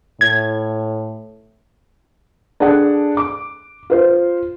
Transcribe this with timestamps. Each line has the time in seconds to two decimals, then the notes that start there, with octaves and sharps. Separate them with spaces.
0.21 A2 G#6
2.60 D4 G#4 A4 D5 F#5
3.17 D6
3.90 F4 C5